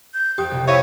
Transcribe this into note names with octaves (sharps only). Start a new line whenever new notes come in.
G6
F2 G4 G5 D#6
C2 C3
E4 C#5 E5 F5 D#7